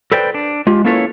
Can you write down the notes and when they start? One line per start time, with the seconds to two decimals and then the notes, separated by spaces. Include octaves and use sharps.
0.12 A4 B4 C5 D5 G5
0.34 D4
0.67 G#3 F4 G4
0.85 A#3 C#4 E4 A4 B4 C#5